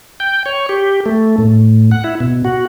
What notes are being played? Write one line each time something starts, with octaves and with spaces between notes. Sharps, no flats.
G5
C#5
G4
A3
A2
F#5
E4
B2
F#4